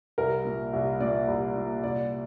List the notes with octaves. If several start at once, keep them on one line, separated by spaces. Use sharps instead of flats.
C2 A#4
A#2
C2
A#2 D5
C2
A#2
C2 D5